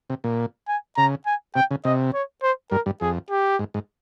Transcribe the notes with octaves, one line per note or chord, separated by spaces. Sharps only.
C3
A#2
G#5
C#3 A#5
G#5
C3 G5
C#3
C3 D#5
C#5
C5
G2 A#4
G2
F2 G#4
G4
G#2
G#2